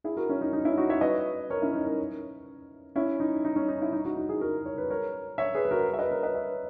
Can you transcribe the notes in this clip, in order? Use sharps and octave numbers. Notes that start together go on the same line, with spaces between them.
E4 G#4
F#4 A#4
C#4 E4
D#4
D#4
C#4 E4
D#4 F#4
C#5 E5
B4 D#5
A#4 C#5
C#4 E4
D#4
A#4 C#5
C#4 E4
D#4
D#4
C#4
D#4
E4
D#4
D#4 F#4
D#4 F#4
E4 G#4
F#4 A#4
C#5
B4
A#4 C#5
C#5 E5
G#4 B4
B4
F#4 A#4
E5
B4 D#5
A#4 C#5
B4 D#5
C#5 E5